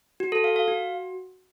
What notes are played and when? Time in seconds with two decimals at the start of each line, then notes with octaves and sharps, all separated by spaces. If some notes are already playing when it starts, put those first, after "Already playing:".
0.20 F#4
0.32 A4
0.44 F5
0.56 F5
0.68 F#4